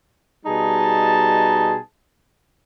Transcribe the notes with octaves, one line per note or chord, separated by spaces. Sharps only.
B2 G3 D#4 G#4 A5